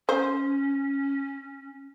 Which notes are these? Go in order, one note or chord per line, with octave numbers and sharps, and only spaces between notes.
C#4 C5